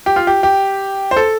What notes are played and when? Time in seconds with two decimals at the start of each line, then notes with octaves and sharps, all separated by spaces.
0.06 G4
0.16 F4
0.27 G4
0.43 G4
1.11 C5
1.17 A4